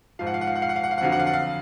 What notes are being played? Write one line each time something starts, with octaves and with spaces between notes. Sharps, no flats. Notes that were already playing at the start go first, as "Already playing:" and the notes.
G#2 F3 F5
F#5
F5
F#5
F5
F#5
F5
F#5
F5
F#5
F5
F#5
F2 D3 F#3 F5
F#5
F5
F#5
F5